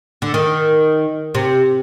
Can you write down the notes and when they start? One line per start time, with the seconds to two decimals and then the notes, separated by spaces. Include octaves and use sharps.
0.22 D3
0.34 D#3
1.35 C3